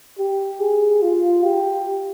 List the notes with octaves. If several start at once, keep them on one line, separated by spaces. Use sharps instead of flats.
G4
G#4
F4
G4